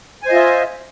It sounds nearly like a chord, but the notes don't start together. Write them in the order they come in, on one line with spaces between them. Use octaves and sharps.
G#5 C5 D#5 F4 E5